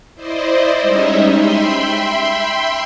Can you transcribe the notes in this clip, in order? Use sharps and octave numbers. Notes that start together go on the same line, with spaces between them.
E4 C5 D5 D#5
G3 G#3 C#4 D#4 D#5 E5
E5 G5 B5 C6